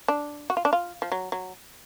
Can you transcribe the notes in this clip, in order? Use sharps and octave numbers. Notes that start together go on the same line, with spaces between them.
D4
F#4
F4
D4
F4
F3
F#3
F#3